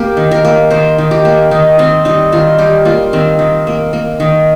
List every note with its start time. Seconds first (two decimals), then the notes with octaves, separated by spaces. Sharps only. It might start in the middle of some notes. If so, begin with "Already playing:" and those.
Already playing: A#3 G4
0.17 D#3
0.31 A#4
0.45 A#3
0.70 D#3 C5
0.98 D#3
1.11 G4
1.25 A#3
1.51 D#3 D#4
1.78 D#3 C4
2.05 G3 D#4
2.32 D#3 F4
2.58 G3 G4
2.85 A#3 F4
3.13 D#3 C4
3.39 D#3
3.67 A#3
3.93 A#3
4.20 D#3